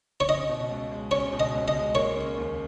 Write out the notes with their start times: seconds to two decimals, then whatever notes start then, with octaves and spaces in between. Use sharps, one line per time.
0.20 C#5
0.28 C#4 D#5
0.49 B2
0.70 C#2
0.91 G#3
1.11 C#4 C#5
1.33 B2
1.40 D#5
1.54 C#2
1.68 D#5
1.75 G#3
1.95 A#3 C#5
2.17 C#3
2.37 D#2